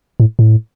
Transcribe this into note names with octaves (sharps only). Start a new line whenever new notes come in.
A2
A2